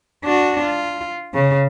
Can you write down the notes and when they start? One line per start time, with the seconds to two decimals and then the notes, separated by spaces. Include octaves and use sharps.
0.24 D4 F#4
0.63 F4
1.34 C#3